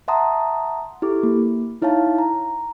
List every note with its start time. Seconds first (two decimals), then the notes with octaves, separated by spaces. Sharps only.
0.08 E5 F#5 A5 A#5 C6 D#6
1.02 E4 G4 A4 D6
1.23 A#3
1.82 D#4 E4 C#5 F5 A5
2.18 A#5